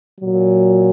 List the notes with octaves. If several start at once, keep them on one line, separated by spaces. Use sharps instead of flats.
A#2 F#3